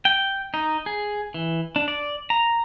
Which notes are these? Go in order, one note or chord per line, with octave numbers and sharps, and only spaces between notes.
G5
D#4
G#4
E3
D4
D5
A#5